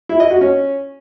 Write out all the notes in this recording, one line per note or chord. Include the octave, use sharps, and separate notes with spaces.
E4
D#5
F#4
C#4